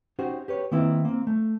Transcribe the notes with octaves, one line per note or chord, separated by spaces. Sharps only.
C#4 D#4 F#4 G4 C5
G4 B4 C#5
D#3 A#3 C4 E4 B4
A#3 C4
A3